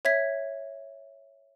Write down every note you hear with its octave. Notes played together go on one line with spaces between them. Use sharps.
C#5 E5 G#6 B6